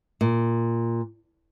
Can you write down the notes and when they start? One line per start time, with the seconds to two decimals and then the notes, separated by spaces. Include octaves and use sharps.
0.21 A#2